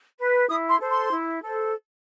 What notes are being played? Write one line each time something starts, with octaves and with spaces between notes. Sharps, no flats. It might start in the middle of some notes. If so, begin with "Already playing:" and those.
B4
E4 D#6
C6
A4 C5
C6
E4
A4 C5